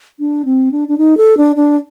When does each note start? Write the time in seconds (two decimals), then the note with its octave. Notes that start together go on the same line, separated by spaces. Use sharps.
0.19 D4
0.45 C4
0.72 D4
0.88 D4
0.98 D#4
1.17 A4
1.37 D4
1.56 D4